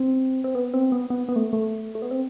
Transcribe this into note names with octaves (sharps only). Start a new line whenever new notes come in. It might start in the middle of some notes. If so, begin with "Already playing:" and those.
Already playing: C4
C4
B3
C4
B3
B3
B3
A3
A3
A3
B3
C4